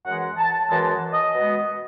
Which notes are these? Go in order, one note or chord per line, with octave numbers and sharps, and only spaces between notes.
F#2 E3 G#3 F#5
A5
F#2 E3 G#3 A5
D#5
B2 G#3 B3